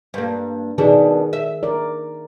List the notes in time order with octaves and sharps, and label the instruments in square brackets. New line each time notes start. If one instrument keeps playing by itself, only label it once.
[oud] G2 A#3
[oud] B2 D4 [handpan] D#3 G#4
[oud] E5
[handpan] A#4 D5